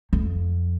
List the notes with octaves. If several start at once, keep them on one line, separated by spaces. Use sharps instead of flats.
F2